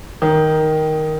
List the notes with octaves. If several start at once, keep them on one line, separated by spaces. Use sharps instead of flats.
D#3